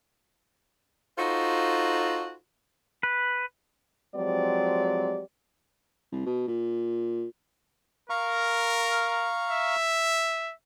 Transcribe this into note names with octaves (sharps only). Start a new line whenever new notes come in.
D#4 F4 F#4 A4 C5
B4
F3 F#3 G#3 C4 G4 D5
C2
B2
A#2
A#4 F5 A#5 C#6
E5